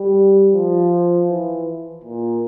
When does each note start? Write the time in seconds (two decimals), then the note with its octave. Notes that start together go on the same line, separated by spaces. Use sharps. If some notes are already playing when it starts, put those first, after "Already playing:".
Already playing: G3
0.53 F3
1.29 E3
2.04 A#2